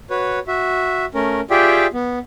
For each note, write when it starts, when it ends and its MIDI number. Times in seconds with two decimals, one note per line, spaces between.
0.10 0.39 66
0.10 0.39 71
0.10 0.39 73
0.48 1.05 66
0.48 1.05 76
1.14 1.41 57
1.14 1.41 61
1.14 1.41 70
1.50 1.87 65
1.50 1.87 67
1.50 1.87 68
1.50 1.87 74
1.50 1.87 76
1.50 1.87 79
1.94 2.19 59